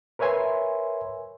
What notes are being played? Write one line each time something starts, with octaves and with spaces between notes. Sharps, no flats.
A#4 B4 C#5 E5 G#5 C6